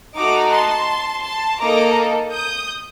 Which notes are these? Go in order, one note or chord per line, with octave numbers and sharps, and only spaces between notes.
A3 D#4 F#4 A#5 D6
A5 C6
A5 C6
A#3 D#4 A4 A#5 D6
D#6 G6